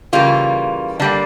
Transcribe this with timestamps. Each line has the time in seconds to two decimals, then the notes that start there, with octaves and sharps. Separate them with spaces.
0.13 C#3 E3 G3 A#3 F4
0.99 D3 G3 A#3 D4